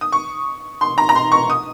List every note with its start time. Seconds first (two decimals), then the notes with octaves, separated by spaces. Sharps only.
0.01 D#6
0.12 C#6
0.81 C6
0.98 A#5
1.09 A#5
1.16 C6
1.32 C#6
1.50 D#6